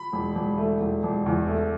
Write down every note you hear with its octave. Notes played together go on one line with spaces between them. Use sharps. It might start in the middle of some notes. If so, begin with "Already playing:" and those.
Already playing: B5
E1
E1
A3
E1
E1
E2
A3